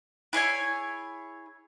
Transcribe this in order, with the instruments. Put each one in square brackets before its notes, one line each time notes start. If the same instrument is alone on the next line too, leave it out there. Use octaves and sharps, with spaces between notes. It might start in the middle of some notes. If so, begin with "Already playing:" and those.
[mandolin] E4 G#4 C#5 G#5